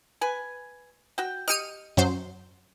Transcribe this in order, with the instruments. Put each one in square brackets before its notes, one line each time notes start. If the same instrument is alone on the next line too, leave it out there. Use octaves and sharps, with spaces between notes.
[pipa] B4 G#5
F#4 G5
[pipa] G4 D#5 [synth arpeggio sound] F6 C#7 D#7
[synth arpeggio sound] F#2 F#3 C5